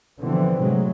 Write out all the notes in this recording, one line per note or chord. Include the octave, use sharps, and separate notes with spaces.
B2 D3 E3 F3 B3 C4
A2 C3 F#3 G#3 A3